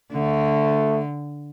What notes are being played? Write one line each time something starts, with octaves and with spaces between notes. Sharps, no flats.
D3 A3